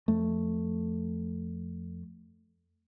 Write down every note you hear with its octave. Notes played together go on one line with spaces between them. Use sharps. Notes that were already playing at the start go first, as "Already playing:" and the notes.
F2 A3